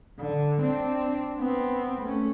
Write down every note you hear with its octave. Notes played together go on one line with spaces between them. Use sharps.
D3
C4 D4
B3 C4
A3 C#4